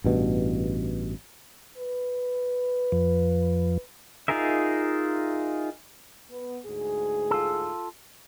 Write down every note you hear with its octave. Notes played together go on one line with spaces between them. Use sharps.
A1 G2 B2
B4
F2 F3
D#4 F4 G#4 A#4 E5
B3
D2 G#2 G#4
F4 A4